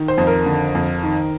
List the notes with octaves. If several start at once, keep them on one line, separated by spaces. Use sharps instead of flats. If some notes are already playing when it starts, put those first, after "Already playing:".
Already playing: D#3
C5
F2
A#4
D3
F2
D#3